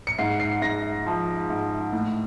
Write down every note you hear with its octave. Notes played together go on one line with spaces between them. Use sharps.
C#7
G#2 C7
C7
G#2 A#6
F3
G#2
A2